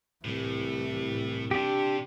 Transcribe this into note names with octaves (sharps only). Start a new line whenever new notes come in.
C2 A2 E3 G3
C3 D4 G4